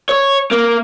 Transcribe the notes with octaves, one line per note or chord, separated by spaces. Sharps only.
C#5
A#3